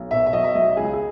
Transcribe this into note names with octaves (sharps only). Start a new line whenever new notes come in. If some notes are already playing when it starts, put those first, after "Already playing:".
Already playing: B1
B2 E5
E5
F#3 D#5
E5
B1 D#5
C#2 G#4
G#4